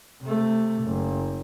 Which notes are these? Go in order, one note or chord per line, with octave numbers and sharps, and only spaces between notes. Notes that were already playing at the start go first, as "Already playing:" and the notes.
C3 A3
F#1